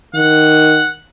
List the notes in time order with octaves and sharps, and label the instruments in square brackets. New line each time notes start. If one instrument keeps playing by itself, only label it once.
[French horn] D#3 [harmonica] F#5